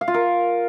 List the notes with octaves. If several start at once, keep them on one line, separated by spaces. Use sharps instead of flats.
F5
F4
A#4